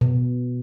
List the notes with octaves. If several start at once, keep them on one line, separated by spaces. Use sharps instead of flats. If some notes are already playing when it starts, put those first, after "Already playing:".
B2